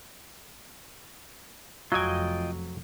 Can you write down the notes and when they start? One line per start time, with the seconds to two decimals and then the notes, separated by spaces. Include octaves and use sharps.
1.92 F1 F2 F#3 F4 D#5 G5 G#5